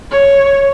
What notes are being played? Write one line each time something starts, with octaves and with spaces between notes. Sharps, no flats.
C#5